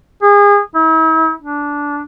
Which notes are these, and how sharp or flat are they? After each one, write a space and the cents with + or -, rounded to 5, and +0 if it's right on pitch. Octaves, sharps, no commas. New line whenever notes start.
G#4 -30
E4 -40
D4 -15